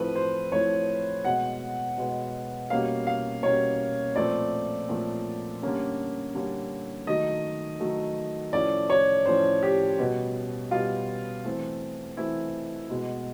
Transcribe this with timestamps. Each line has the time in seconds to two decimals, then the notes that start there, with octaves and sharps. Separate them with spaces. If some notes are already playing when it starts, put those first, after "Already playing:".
Already playing: A2 F3 A3 C4 B4
0.15 C5
0.52 A2 F3 A3 C4 C#5
1.25 B2 G#3 B3 F#5
1.98 B2 G#3 B3
2.70 B2 G3 A#3 C#4 F5
3.07 F5
3.43 B2 G3 A#3 C#4 C#5
4.16 A#2 F3 A3 C4 D5
4.89 A#2 F3 A3 C4
5.62 D3 G3 A#3 C#4
6.34 D3 G3 A#3 C#4
7.07 D#3 F#3 A3 D#5
7.80 D#3 F#3 A3
8.53 A2 F3 A3 C#4 D5
8.90 C#5
9.26 A2 F3 A3 C#4 C5
9.63 G4
9.99 B2 G3 B3
10.71 B2 G3 B3 F4
11.44 E3 A3 C4
12.17 E3 A3 C4 E4
12.90 B2 G#3 B3